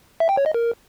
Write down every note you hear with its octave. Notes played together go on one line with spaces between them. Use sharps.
E5
G5
C#5
D#5
A#4